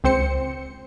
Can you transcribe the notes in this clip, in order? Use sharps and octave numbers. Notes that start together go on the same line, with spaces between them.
C#2 C4 C5 C#7